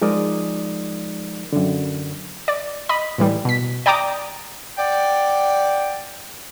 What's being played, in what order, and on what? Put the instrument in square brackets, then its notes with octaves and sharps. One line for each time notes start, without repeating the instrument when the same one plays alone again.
[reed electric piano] F3 G#3 D#4 A#4 D5 D#6
F#2 D3
[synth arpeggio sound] D5
D#5 B5
A2 E3 G3
B2 B6
D5 G5 A#5 D6 D#6
[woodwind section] D5 F#5 G5